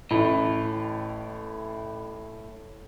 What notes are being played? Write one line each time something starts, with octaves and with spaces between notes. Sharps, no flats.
A1 A2 E4